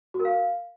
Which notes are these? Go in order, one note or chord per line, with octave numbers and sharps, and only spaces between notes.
F#4
A#4
F5